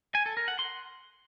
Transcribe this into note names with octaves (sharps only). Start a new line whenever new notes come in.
G#5
A4
A#4
F#5
C6